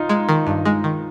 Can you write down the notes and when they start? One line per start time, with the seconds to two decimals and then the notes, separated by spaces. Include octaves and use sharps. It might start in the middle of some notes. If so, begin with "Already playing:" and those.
Already playing: D#4 F4
0.09 G#3
0.29 D#3
0.47 G2
0.65 G#3
0.84 D#3